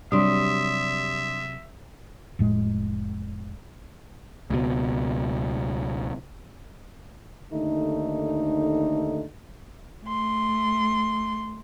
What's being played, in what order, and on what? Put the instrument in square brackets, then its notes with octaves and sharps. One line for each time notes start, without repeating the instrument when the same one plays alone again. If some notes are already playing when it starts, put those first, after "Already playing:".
[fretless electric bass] C3 F#3 [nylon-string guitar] G3 D4 [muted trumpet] E5 [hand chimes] C6 D#6
[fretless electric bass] F1 A2 G#3
[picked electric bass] C#2 B2
[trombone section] D#2 D3 A3 D#4
[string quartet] A3 C6